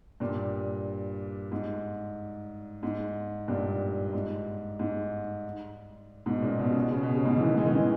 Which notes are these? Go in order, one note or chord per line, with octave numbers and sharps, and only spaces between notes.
G2 A#2
G#2
G#2
G2 A#2
G#2
G#2
G#2 B2
A#2 C#3
B2
C#3
B2
C#3
B2
C#3
G#2 B2
E3
B2 D#3
E3 G#3
D#3
C#3 E3